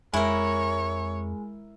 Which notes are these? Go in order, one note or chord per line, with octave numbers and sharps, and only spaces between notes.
F2 G#3 E4 A#4 C#5